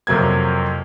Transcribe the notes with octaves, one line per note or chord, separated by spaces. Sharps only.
F2 C3 F#3 A#3 G#6